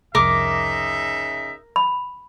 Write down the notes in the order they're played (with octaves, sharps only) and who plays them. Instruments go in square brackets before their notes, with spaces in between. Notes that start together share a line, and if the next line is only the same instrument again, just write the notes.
[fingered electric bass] C2 F2 [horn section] C#3 D#4 E5 [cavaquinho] A#4 D6
[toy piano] B5